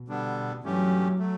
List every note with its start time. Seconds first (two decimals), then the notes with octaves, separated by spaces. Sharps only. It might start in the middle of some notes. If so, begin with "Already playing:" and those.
Already playing: B2
0.08 D3 G3 B3 D4
0.64 G2 E3 F#3 A3 C#4 G4
1.19 F#3 A3